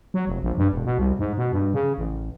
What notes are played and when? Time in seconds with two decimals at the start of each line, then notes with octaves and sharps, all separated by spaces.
0.14 F#3
0.27 F1
0.43 A#1
0.58 G2
0.73 E1
0.85 B2
0.98 C2
1.19 G#2
1.37 B2
1.52 G2
1.74 C#3
1.98 A1